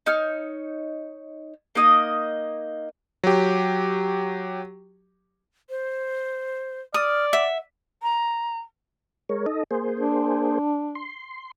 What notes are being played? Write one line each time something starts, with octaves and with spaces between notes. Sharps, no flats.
D#4 C#5 F6
A#3 D#4 D#5 D#6
F#3 G4
C5
D5 D#6 F6
E5 F#5
A#5
G#3 A#4 C#5
D#4 A4 D#5
A#3 G#4 C5
D4
C6